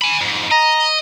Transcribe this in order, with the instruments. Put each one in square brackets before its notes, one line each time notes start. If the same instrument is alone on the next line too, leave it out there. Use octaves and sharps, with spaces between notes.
[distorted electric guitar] G#5 B5
F2 G#2
[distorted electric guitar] D#5 [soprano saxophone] A#5